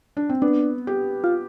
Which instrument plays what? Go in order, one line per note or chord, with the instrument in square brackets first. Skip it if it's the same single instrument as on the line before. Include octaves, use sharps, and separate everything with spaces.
[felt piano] D4
C4
[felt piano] B3 [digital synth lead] D4
[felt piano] G4
[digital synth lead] F4